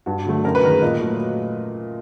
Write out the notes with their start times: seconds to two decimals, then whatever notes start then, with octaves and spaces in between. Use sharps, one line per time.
0.06 G2 F#4
0.26 D3 F#3 A3
0.45 F#2 A#4
0.55 B4
0.63 D#3 G#3 A#4
0.82 A#2 D#5
1.01 F#3 A3